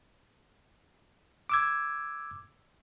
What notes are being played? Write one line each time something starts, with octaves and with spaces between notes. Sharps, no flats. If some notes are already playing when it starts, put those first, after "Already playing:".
D6 E6 G#6